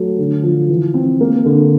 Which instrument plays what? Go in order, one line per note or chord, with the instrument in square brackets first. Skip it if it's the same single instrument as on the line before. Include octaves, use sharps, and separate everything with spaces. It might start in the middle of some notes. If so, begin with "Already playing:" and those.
Already playing: [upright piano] F#3 A3
D3
F3
E3
C4
A#3
D3